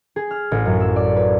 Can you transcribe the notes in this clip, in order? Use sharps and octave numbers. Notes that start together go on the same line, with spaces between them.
G#4
F6
A1
F#2
E6
D5
B4